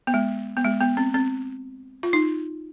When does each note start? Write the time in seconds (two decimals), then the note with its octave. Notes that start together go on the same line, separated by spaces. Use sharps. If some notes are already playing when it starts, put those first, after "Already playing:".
0.07 B3
0.14 G#3
0.57 B3
0.65 G#3
0.81 B3
0.97 C4
1.14 C4
2.03 F4
2.13 D#4